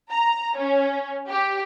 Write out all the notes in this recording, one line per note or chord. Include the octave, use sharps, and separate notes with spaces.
A#5
C#4
G4